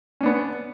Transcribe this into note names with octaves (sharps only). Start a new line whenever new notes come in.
B3 C#4 D4